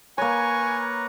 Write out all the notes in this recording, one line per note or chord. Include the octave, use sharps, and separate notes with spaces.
A#3 B4 C#5 G#5 A#5 C#6